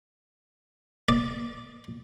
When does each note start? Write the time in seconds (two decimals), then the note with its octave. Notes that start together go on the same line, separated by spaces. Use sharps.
1.09 D5